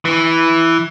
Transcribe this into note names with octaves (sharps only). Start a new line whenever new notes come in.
E3